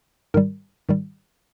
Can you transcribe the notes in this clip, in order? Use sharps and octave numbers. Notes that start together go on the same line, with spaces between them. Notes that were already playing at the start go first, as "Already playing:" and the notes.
G#2 D#3 G3 A#4
G#2 D#3 G3